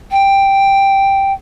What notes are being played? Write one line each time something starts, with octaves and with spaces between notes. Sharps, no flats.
G5